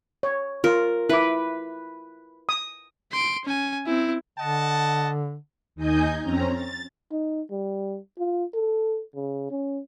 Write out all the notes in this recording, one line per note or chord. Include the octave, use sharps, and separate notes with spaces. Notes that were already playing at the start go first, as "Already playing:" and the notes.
C#5
F4 A#4
E4 B4 D6
D#6
C6 D7
C#4 G#5
C4 E4
D3 D#5 F#5 A5
D#2 D#4 D#5 G#5 G6
F2 C4 C#4 A#5
A6
D#4
G3
F4
A4
C#3
C#4